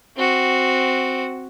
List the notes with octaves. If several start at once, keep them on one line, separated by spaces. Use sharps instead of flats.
C4 F#4